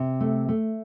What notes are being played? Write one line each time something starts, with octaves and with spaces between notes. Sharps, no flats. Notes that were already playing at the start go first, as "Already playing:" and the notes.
Already playing: C3
A3
A3